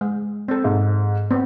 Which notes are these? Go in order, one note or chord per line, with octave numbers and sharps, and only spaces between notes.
G#3
C4 A4
G#2
B3 C4